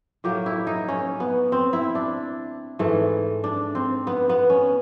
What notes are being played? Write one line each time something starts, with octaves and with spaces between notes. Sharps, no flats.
A2 F#3 A#3 G4
E4
D#4
C#4
B3
C4
E4
D4
G#2 E3 A3
D4
C4
B3
B3
C#4